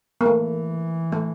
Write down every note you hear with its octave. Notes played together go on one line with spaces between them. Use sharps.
A#3
E3 A3
A3